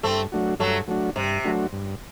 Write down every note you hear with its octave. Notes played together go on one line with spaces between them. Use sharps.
G2 A3 C4
F#3 A3 D4 F#4
G2 F#3 A3
F#3 A3 D4 F#4
G2 C3
F#3 A3 D4 F#4
G2